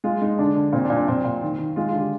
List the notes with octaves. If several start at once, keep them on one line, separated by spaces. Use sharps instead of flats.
G#3 F4
G#3 D#4
D3 D4
D3
A#2 C4
D4
A#2
D4
A#2 C4
A#2
D#3
D#3
G#3 F4
D3 F4
G4